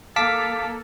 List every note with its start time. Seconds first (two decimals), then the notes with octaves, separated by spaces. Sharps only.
0.16 A#3 A4 F5 A5 D6 B6